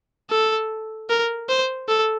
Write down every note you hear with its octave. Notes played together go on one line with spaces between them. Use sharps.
A4
A#4
C5
A4